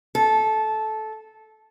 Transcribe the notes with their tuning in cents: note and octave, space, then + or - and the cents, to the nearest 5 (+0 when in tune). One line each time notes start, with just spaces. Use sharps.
A4 -15